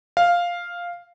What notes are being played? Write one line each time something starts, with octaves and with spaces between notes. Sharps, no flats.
F5